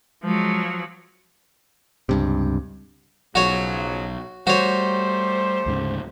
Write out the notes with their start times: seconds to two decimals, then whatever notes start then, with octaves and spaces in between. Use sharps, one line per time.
0.23 F3 F#3 G#3
2.09 C#2 G2 C3
3.35 B1 C#3 F3 F#3 F#4 C#5
4.47 G3 A3 F#4 G4 C5 C#5
5.66 D2 G#2 C#3